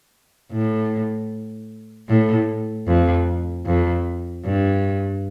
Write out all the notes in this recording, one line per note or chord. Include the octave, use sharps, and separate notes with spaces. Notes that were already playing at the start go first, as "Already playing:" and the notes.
A2
A2
F2
F2
G2